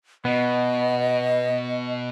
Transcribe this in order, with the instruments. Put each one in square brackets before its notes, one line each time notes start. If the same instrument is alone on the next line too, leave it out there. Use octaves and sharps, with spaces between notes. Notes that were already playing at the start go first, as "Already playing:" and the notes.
[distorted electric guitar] B2 [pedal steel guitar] B3 [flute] D#5